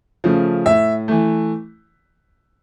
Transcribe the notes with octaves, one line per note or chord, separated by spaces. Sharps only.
C#3 F3 A3
A2 E5
E3 A3